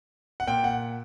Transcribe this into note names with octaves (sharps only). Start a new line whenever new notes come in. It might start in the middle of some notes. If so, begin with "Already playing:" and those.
F#5
A#2 G5
F#5